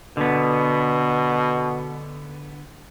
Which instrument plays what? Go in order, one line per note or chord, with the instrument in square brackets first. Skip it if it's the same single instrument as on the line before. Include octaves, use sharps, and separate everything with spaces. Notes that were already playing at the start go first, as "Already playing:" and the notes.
[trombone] B2 [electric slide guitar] D3 B3